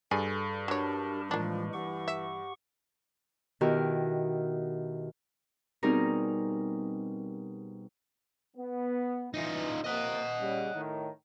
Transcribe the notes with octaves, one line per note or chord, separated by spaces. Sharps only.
G2 G#4 A4 D5 G#5
F#3 D4 G4 A#4 C#5 A5
A2 E3 F3 G#3 A#3 D4
E3 G4 F#5 C#6
E5
B2 D#3 E4 F#4 G4 A#4
B2 G3 C4 D#4 G#4 A#4
B3
E3 D#4 F4
C3 F3 A#3 D#5 F#5
C#3 G3
A2 D#3